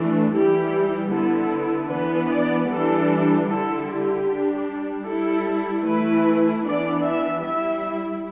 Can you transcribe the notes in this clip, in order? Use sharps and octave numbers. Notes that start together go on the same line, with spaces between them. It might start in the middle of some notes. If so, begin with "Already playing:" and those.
Already playing: E3 A3 D4
E3 G3 E4 G4
D3 B3 E4 A4
E3 B3 D4 B4
D5
E3 G3 D4 A4
D3 G3 E4 A4
G4
G3 D4
G3 E4 A4
E3 A3 E4 B4
E3 B3 D4 D5
E5
G3 E4 E5